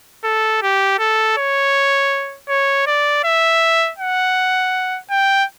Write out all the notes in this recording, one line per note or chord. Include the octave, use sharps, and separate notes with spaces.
A4
G4
A4
C#5
C#5
D5
E5
F#5
G5